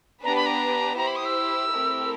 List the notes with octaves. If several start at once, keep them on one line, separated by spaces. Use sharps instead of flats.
B3 D4 G4 B4 A#5
B5
A#5
E4 G4 C5 A#5
B5
D#6
E6
A3 C4 E4 G4 A#4